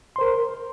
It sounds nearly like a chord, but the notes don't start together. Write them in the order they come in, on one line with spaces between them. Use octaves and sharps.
C6 C5 A#4